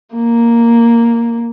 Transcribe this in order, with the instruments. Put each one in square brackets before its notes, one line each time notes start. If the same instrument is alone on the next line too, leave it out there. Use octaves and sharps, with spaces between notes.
[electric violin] A#3